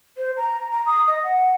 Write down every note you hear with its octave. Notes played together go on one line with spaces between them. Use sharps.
C5
A#5
A#5
D#6
D#5
F#5